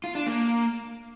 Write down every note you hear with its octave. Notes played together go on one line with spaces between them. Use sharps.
F4
D4
A#3